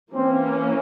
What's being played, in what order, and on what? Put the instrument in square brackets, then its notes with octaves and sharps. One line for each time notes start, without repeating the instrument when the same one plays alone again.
[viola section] E3 A#3 C#4 [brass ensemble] C4